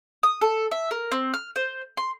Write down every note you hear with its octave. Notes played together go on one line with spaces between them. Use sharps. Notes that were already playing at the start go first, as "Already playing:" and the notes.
D#6
A4
E5
A#4
C4
F6
C5
C6